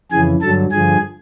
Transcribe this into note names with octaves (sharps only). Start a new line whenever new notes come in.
F2 C#3 E3 G#4 G#5
G2 D3 F#3 A4 A5
G2 D3 F3 G#4 G#5